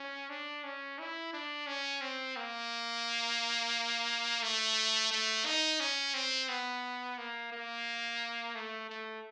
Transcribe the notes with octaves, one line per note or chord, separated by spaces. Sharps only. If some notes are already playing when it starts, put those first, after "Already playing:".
Already playing: C#4
D4
C#4
E4
D4
C#4
C4
A#3
A3
A3
D#4
C#4
C4
B3
A#3
A#3
A3
A3